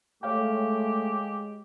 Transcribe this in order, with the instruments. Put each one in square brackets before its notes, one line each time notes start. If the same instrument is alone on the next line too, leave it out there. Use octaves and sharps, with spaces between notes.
[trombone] G#3 [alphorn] A3 [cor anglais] G4 [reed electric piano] C#5 F5 G5